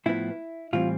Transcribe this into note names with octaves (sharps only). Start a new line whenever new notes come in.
A2 F3 B3 E4
A2 E3 G3 C4 F4